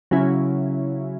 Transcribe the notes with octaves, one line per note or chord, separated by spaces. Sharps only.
C#3 F#3 C#4 E4